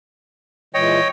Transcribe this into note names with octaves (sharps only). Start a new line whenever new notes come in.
A#2 E3 G#3 C#5 D#5 G5